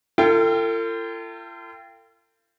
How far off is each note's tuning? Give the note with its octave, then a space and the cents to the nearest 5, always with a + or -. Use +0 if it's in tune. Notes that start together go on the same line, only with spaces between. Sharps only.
F4 -35 A4 +40 G5 +0